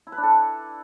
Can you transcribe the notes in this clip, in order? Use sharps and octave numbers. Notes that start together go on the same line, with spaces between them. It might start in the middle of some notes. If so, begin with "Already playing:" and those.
E4
B4
D4
A4